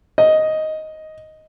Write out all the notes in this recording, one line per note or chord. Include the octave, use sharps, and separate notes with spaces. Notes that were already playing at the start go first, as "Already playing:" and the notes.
D#5